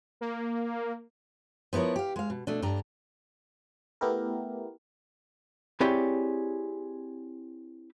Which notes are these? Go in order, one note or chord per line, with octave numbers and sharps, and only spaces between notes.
A#3
F3 B3 E4 A#4 C#5
G4 F5
G#3 F5
B2
B2 A3 D4
G2 D4 A#5
A3 B3 E4 G4 A#4
C4 E4 G4 G#4 C#5 D5